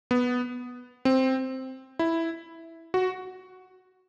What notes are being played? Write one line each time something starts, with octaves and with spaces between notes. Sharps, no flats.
B3
C4
E4
F#4